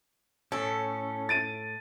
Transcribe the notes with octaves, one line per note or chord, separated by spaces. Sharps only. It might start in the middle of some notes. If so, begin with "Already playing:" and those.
A2 C#4 A4
A6 D7 D#7